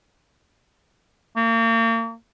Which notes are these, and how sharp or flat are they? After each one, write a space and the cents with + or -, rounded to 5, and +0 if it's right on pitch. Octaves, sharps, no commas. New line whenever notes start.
A#3 -35